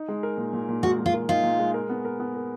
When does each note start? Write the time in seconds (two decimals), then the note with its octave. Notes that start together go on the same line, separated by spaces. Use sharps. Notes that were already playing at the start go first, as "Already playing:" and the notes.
Already playing: D#4
0.08 G#3
0.23 A#4
0.37 A#2
0.53 A#2
0.69 A#2
0.83 G#3 F#4
0.99 G#3
1.06 F4
1.14 A#4
1.29 D#4 F4
1.44 A#2
1.59 G#3
1.74 A#4
1.89 B3
2.05 A#4
2.20 B3
2.35 A#4